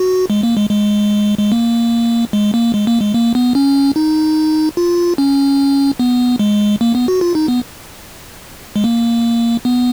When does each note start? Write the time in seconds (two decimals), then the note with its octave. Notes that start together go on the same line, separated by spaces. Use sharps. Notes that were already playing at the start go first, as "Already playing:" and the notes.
Already playing: F#4
0.30 G#3
0.43 A#3
0.57 G#3
0.70 G#3
1.38 G#3
1.52 A#3
2.33 G#3
2.54 A#3
2.74 G#3
2.87 A#3
3.01 G#3
3.14 A#3
3.35 B3
3.55 C#4
3.96 D#4
4.77 F4
5.18 C#4
6.00 B3
6.39 G#3
6.81 A#3
6.95 B3
7.08 F#4
7.21 F4
7.35 D#4
7.48 B3
8.76 G#3
8.84 A#3
9.65 B3